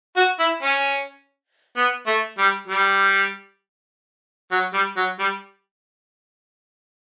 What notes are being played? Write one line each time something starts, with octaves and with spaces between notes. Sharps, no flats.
F#4
E4
C#4
B3
A3
G3
G3
F#3
G3
F#3
G3